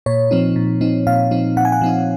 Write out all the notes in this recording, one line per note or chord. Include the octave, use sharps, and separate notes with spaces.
A#2 C#5
F3 C4 D#4
A#2
F3 C4 D#4
A#2 F5
F3 C4 D#4
A#2 F#5
G#5
F#5
F3 C4 D#4